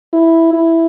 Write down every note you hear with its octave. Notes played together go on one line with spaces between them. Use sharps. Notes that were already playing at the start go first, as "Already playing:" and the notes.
E4
E4